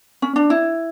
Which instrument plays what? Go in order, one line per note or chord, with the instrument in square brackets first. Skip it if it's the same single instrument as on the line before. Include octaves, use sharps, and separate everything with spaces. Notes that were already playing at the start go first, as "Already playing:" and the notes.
[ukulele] C#4
D4
E4